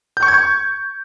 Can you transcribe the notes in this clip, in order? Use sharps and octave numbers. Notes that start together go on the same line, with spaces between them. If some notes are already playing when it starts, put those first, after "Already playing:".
G6
C#6
G#6
C#6